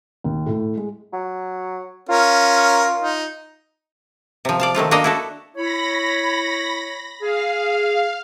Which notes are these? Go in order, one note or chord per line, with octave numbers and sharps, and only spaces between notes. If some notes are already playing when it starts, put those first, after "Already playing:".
D#2
A2
G#3
F#3
C#4 F4 A#4
D#4
C3 F3
D5 F5 A5
D#3 F#3 A3 F4
A#3 D4 F#4 D#5 F5
E4 F#4 A4
E4 C#5 B5 A#6
G#4 F5